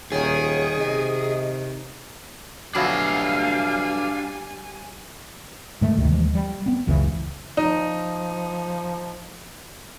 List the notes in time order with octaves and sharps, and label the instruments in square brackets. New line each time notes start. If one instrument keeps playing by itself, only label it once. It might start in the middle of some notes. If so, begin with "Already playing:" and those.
[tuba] D#1 [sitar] D#3 [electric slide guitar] G#4 [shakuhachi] C#5
[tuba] C3 [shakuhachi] D#5
[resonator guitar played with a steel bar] F2 B2 F#3 [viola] G3 G#5 [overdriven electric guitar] D4 E5 [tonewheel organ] F5
[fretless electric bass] G#2 D#3 G#3 A3
G1 D2 C3 D#3
D#2 E3 F3 G#3
G3
B3 C4
F#1 C#2 C#3 E3
[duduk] F3 [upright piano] D#4